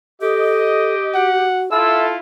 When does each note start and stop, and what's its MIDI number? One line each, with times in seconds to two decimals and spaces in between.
0.22 1.47 67
0.22 0.95 69
0.22 1.14 75
1.15 1.70 66
1.15 1.67 78
1.72 2.18 64
1.72 2.18 65
1.72 2.15 69
1.72 2.06 76
1.72 2.04 88